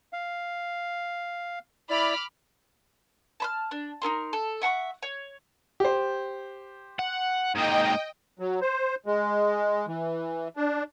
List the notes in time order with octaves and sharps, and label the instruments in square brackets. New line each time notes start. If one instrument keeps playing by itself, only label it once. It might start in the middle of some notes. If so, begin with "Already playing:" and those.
[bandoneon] F5
[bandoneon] E4 D5 [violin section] B5 D6 F6
[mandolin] A5 B5 F6
D4
D#4 E4 A#4 C6
A4
E5 F#5 A5 C#6
C#5
[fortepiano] G4 C5
[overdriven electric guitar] F#5
[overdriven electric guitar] G#2 A#3 [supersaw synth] D#5 G5
[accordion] F#3
C5
G#3
E3
D4